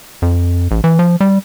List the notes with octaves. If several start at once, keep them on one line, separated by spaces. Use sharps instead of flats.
F2
A1
E3
F3
G3